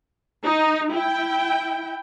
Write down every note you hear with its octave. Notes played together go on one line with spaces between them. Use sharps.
D#4
E4 G5